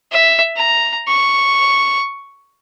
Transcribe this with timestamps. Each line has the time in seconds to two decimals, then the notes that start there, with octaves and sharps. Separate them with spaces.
0.11 E5
0.57 A#5
1.08 C#6